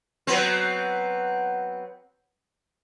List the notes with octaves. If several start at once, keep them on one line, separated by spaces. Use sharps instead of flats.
F#3 B3 C4